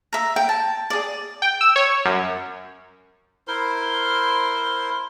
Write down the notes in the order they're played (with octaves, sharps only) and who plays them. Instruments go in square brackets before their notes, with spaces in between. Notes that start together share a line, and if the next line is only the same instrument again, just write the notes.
[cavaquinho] E5 A#5
G5
A5
G#4 D5
[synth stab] G5
E6
C#5
F#2
[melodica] E4 A#4 C5 C6